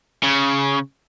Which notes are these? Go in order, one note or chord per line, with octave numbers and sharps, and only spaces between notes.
C#3